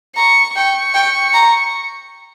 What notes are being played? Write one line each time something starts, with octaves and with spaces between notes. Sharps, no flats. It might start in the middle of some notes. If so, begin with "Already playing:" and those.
A#5 C#6
G5 C#6
G5
A#5